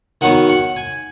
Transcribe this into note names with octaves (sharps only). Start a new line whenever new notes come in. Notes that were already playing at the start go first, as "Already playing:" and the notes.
D#3 F#3 B3 D#4 F#5
F#5
G#5